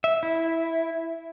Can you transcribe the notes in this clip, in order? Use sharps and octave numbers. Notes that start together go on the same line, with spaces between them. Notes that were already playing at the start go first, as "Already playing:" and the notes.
E5
E4